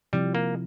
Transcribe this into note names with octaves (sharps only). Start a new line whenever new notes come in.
C3 F3 G3 C4 E4
A#3